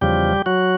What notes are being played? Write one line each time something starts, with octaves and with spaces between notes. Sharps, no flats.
E2 C#3 F3 G3 G4
F#3 F#4